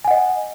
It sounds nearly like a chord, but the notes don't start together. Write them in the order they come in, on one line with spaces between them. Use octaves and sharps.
G#5 F#5 D#5